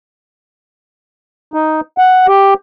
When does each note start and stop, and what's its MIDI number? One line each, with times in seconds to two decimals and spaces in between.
1.54 1.81 63
1.98 2.27 78
2.28 2.54 67